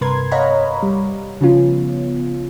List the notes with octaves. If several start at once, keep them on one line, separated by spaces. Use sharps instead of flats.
G2 C3 A#4 B4 C6 G#6
C#5 D#5 F5 F#5 A#5 B5
G3
C#3 F3 B3 C#4 F4